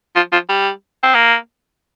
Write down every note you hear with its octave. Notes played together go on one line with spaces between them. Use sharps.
F3
F3
G3
C4
A#3